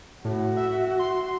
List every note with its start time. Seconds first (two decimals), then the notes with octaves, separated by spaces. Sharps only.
0.25 A2 F#4
0.57 E5
0.99 C6